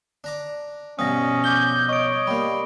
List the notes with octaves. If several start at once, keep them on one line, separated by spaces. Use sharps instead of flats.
D4 A#5 D6
G2 B2 F3 C#4 D#6 A#6
D6 G6 G7
C#5 D#5 C#6 D7
G3 A#3 B5